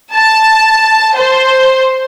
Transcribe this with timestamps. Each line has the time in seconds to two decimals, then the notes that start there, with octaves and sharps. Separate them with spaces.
0.14 A5
1.16 C5